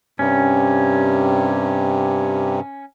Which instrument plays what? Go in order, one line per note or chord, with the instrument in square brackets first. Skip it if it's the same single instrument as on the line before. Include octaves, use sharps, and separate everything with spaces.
[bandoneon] G2 C3 [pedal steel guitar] C#4